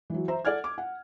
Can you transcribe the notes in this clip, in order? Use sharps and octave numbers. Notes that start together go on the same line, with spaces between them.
E3 F#3
C5 E5 A#5
A4 D5 F#5 F6 G#6
D6
F#5